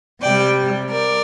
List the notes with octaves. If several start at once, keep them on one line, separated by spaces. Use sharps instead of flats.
C3 G3 D5 G5
A#4 D5